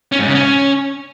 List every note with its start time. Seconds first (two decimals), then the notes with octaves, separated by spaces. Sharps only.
0.12 C#4
0.20 G#2
0.27 C#3
0.35 C#4